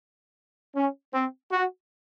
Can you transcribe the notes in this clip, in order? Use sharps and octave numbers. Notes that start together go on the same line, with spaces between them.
C#4
C4
F#4